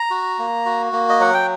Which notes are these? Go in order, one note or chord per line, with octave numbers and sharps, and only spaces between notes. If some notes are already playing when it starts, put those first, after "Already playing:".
Already playing: A#5
F#4
A#3
F#4
A#3
D#5
F#3 F#5
G5